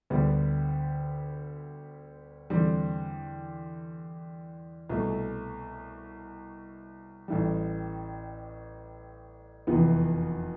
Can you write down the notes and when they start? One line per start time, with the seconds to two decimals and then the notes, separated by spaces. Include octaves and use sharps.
0.10 D2 D3 G3 B3
2.50 E2 D3 G3 C4
4.89 C2 B2 A3
7.28 A1 A2 G3
9.67 F1 E2 C3 E3 B3